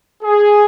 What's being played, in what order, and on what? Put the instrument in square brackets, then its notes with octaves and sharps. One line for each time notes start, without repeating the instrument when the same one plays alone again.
[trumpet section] G#4